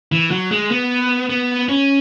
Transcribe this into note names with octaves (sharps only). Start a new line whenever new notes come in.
E3
F#3
G#3
B3
B3
C#4